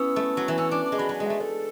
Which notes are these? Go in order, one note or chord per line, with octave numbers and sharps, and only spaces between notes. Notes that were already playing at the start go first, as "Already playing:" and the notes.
Already playing: B3 C#4 E4 E6
A3
F#3
E3
C#4 E6
D4 D6
D6
G#3
F#3 B5
F#3 G#5
G#3
A3 E5
A3 A4